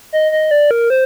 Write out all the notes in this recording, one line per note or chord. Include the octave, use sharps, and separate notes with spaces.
D#5
D#5
D5
A#4
C5